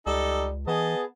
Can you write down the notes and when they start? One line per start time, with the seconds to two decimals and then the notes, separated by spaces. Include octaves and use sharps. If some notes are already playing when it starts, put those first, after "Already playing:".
0.07 C#2 G3 D#4 A4
0.67 E3 B3 G#4 D#5 A5